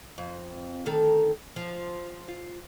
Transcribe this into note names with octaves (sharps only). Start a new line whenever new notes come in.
F2
D2 D#3 A4
F3
F4